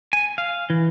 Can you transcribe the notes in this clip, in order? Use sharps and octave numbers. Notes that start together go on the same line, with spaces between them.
G#5
F5
E3